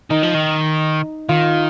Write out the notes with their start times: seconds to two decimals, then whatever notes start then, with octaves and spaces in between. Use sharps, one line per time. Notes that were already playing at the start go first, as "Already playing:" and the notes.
0.10 D#3 D#4
0.23 F3
0.35 D#3
1.29 D#3 F4